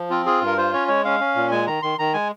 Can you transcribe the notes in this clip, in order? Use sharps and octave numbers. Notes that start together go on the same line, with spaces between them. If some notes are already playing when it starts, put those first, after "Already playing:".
Already playing: F3
C4 F4
F4 G#4
G2
A#4
F4 C5
C#4 C#5
G#3 C#5
C#4 F5
C#4
A#2
G#3 G#5
D#3 A#5
D#3 C6
D#3 A#5
G#3 G#5